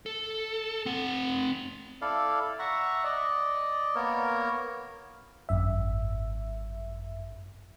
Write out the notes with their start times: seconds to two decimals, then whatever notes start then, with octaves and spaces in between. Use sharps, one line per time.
0.06 A4
0.86 C4 F#5
2.02 E4 A4 D5 F5
2.59 E5 F#5 A#5 C#6
3.04 D5 D#5
3.95 A#3 B3 A#4 C#5
5.49 G#1 F#2 E5